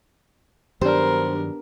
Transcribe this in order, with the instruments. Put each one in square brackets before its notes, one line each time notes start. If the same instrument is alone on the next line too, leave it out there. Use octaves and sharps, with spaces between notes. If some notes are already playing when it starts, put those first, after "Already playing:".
[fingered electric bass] G2 D#3 F#3 [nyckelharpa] B3 A#4 [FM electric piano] D4 G4 [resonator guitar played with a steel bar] C5